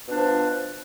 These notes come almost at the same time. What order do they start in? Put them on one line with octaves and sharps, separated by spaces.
B2 D4 F3